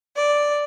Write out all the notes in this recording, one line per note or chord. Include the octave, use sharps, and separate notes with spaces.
D5